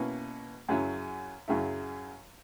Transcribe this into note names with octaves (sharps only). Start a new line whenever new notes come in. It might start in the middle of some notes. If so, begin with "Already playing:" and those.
Already playing: B2 A#3 C#4 E4
F#2 C#3 F#3 C#4 E4
F#2 C#3 F#3 C#4 E4